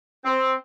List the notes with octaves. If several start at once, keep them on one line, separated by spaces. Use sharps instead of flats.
C4